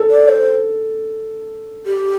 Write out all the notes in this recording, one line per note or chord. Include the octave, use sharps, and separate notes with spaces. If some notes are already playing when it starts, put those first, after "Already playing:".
Already playing: A4
D5
C5
G4